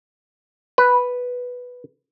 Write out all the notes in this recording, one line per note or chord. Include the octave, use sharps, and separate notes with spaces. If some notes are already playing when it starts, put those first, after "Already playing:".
B4